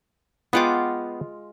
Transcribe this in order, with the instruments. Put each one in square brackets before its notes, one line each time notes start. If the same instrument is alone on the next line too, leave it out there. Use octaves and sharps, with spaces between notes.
[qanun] G#3 F4 D6 [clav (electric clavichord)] B3 F#5 G5